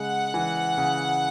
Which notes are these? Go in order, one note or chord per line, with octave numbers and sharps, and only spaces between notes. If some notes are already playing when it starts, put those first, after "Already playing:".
Already playing: C#3 G#3 F#5
E3
C#3